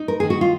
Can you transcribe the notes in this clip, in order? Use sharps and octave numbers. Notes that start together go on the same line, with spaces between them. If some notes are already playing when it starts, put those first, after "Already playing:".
Already playing: D#4
A#4
D#3 G#4
F#4
F4